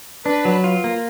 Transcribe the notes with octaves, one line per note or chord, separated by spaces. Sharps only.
D4 B4
F#3
F4
A#3